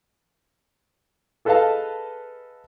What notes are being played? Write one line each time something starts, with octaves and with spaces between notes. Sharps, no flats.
G#4 A4 B4 D#5 F5 A5